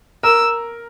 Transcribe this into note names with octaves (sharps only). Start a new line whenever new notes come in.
A#4 E6